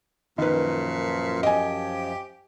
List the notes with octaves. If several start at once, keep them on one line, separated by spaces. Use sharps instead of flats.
F#2 A#2 D#3 F3 B4
G4 D#5 G#5